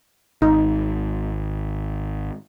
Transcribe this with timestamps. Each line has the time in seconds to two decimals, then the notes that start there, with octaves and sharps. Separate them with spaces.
0.42 G#1 D#4